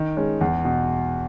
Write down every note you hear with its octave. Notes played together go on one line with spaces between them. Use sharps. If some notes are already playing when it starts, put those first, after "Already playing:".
Already playing: D#3
G#3 C#4
E2
B2